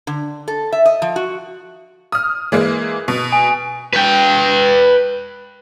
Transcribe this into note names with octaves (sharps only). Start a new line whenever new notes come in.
D3
A4
E5
D#5
F3
F#4
D#6 F6
E3 G#3 A#3
B2
G#5
B4 G5